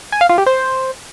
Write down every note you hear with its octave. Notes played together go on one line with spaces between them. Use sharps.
G#5
F5
F4
G4
C5